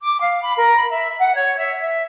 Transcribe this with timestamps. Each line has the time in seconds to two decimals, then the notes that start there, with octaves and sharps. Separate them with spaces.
0.01 D6
0.21 F5
0.43 B5
0.57 A#4
0.77 B5
0.90 E5
1.19 F#5
1.34 C#5
1.57 E5
1.79 E5